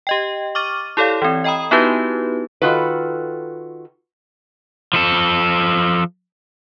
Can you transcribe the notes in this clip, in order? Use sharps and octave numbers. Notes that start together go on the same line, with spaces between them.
G4 D#5 G5
C#6 D6 F6 A6 D#7
E4 G4 A4 C#5 D5 F5
E3 C4
D#5 G5 A#5 B5 D#6
B3 D#4 E4 F#4 G4 B4
D#3 F4 F#4 A4 B4
F3 A4